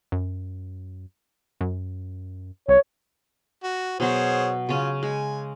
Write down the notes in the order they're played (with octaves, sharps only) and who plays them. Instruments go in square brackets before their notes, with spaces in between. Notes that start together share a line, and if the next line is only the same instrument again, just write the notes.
[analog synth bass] F#2
F#2
[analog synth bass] C2 [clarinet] C#5
[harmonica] F#4
[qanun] B2 F#3 [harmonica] G#4 C5 C#5
[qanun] C#3 C#4 [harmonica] F4
[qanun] G#3 [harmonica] G#5